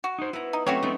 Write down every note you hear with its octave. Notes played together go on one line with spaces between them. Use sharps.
F#4
D#4 C5
B3 E4 A#5
D#4
F#3 A3 C4 C#4 E4 F#4 G4 C#5
A3 B3 C4 D#4